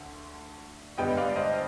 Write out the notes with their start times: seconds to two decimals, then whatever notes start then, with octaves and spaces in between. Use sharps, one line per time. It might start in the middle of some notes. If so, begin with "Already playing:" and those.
Already playing: D2 D3
0.98 G2 D3 G3 B3 D#5 G5
1.17 D5 F5
1.36 C5 D#5